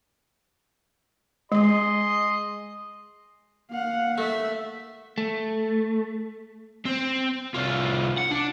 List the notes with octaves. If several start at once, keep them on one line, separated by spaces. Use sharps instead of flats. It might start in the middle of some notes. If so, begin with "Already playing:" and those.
G#3 G#4 D#5 C6
A#3 F5 F#5
A3 E5
A3
C4
C2 F4
F#5
D4